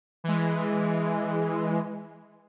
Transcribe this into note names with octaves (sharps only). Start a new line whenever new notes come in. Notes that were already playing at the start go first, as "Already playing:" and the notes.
E3 G#3